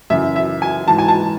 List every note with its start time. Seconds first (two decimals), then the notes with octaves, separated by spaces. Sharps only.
0.10 F#2 C#3 E3 E5
0.36 E5
0.62 G#5
0.88 G#2 E3 A5
0.98 G#5
1.08 A5